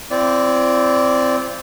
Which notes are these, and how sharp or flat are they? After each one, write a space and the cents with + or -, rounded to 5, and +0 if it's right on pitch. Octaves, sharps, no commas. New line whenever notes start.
C4 +0 E4 +45 D5 -15